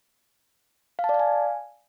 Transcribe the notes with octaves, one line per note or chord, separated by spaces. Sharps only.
F5
A5
D5
F5
G#5